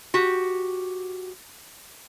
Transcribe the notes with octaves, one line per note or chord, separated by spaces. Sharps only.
F#4 G4